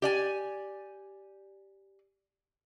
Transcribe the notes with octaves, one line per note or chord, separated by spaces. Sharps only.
G4 D5 G#5